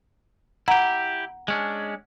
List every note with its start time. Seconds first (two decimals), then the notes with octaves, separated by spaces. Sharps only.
0.68 E4 G4 F#5 A#5
1.48 G#3 C#4 D4